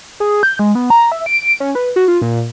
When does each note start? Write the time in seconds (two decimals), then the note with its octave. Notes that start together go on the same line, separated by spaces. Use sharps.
0.20 G#4
0.43 G6
0.59 G#3
0.75 B3
0.90 A#5
1.12 E5
1.26 D7
1.60 C#4
1.75 B4
1.96 F#4
2.08 F4
2.22 A#2